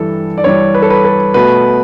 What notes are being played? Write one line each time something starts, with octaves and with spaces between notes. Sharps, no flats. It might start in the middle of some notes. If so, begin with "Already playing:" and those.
Already playing: G2 E3 G3 A4
D5
G2 E3 G3 C#5
B4
A4
B4
A4
B2 A3 B4